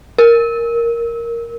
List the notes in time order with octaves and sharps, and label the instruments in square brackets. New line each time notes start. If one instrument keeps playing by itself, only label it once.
[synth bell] A#4